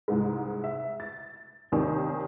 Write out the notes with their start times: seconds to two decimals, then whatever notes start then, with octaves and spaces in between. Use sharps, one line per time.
0.08 C2 G#2 G#3
0.64 E5
1.00 A6
1.72 D#2 C3 D#3 D4 G#5